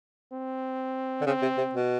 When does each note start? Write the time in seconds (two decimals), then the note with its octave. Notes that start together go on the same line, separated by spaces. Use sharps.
0.32 C4
1.21 D3
1.26 C#3 C4
1.42 C3
1.57 C3
1.74 B2